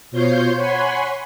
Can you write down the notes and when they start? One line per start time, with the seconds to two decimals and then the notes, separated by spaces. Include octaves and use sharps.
0.11 B2 F4 C5 C#5 C6 G6
0.56 C#5 F#5 G#5 B5 C6